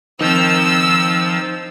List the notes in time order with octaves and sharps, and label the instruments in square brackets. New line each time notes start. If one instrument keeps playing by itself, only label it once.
[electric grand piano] D#3 C4 [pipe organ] F3 [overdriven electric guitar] D#4 [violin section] E6